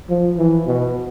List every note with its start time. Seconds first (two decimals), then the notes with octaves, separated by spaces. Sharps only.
0.09 F3
0.37 E3
0.66 B2